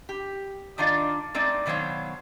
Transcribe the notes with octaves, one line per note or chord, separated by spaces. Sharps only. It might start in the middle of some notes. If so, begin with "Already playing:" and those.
G4
D#3 D4 D#4 F4 D5 F5
G#3 A3 C4 D#4 D5
B2 D#3 F#3 C5 C#5 F5